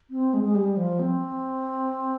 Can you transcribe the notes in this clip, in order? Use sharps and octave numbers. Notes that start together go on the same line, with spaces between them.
C4
G#3
G#3
G3
F3
C4